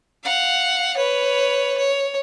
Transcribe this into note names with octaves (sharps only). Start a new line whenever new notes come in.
F5 F#5
B4 C#5
C#5